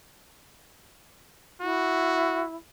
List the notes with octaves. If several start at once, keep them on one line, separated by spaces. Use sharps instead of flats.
E4 F#4